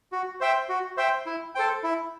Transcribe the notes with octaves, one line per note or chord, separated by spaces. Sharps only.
F#4
C5 E5 G5
F#4
C5 E5 G5
E4
A4 C5 G5
E4